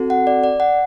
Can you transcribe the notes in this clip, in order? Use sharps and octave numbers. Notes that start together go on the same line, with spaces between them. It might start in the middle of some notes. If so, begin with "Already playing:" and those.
Already playing: C4 F#4 A4
F#5
D5
D5
F#5